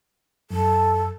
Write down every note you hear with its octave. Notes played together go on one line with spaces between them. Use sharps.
F#2 A4